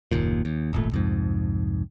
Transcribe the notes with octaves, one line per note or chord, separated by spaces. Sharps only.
F#1 D#2 A#2
D#2
D#1 G#1 A#2 A3
C2 F2 G#2